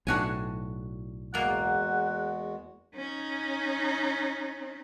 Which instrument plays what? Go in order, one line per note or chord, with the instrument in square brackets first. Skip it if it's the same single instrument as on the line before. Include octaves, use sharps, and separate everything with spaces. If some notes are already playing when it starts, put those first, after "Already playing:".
[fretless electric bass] B1 A2 [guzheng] D4 F#4 G#5
[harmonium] E2 G#3 F#4 [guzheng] A#3 D5 [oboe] F#5
[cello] C#4 D#4